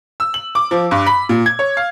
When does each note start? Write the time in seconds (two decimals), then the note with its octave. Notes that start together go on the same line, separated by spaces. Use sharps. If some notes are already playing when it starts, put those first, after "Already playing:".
0.20 E6
0.34 F#7
0.55 D6
0.71 F3
0.91 G2
1.06 B5
1.29 A#2
1.46 G#6
1.59 C#5
1.77 F5